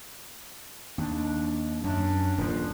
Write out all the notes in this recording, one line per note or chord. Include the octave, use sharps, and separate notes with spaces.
D#2 D4
F#2 F#3 C#4 D4
D#1 F3